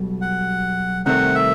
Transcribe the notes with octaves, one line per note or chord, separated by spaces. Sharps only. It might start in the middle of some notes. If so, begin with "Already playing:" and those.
Already playing: B1 B2 G3
F#5
C2 C3 D#3 A3 C4 F#5
E5